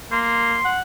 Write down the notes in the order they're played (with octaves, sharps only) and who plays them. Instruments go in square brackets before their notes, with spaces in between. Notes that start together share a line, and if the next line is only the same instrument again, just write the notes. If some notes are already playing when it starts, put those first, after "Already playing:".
[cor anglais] A#3 [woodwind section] C6
[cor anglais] F#5